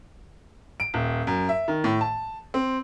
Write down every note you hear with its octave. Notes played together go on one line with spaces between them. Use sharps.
D7
D#1
F#2
E5
D#3
A2
A5
C4